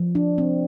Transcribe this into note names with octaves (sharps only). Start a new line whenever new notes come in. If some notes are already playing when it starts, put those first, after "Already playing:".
Already playing: F3
D4
C4